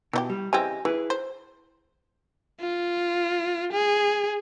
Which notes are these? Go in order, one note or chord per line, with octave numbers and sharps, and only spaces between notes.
B2 E3 D#4 G4
G3
C#3 E3 C4 G4 D#5 G#5
E3 E4 G#4 B4
C5
F4
G#4